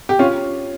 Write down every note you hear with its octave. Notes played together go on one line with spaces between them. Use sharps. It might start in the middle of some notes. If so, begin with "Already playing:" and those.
G4
C#4 F4